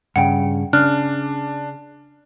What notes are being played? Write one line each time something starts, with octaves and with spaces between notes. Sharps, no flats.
G2 C#3 F#5 G5
C#3 D4 F6 F#6